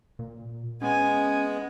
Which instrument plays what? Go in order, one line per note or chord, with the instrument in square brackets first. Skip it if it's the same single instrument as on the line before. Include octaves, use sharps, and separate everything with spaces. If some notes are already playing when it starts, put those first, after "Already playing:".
[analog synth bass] A#2
[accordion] G#3 B3 [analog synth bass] C#4 [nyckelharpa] G#5